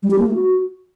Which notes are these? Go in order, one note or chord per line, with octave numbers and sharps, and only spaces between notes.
G3
G4
A#3
A3
F#4